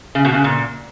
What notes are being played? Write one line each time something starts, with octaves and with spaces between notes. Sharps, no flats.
C#3
B2
C#3
A#2